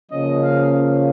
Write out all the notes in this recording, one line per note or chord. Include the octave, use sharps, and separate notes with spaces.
C#3 F3 A#3 C#4 D#5
F5